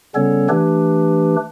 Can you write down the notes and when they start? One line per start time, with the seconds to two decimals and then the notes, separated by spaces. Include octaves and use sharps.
0.15 C#3 G3 B3 C#4 A4 C#5
0.49 E3 A3 D4 G4 B4